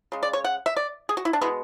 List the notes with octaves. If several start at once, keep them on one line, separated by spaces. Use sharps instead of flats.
C#3 G#3
D5
C#5
F#5
E5
D5
G#4
F#4
E4
D4
B2 G#3 B3 E4